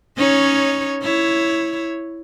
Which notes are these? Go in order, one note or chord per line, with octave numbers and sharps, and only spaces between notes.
C#4 D#4 C#5
E4 C#5